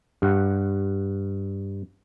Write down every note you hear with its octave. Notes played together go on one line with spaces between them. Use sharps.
G2 F#5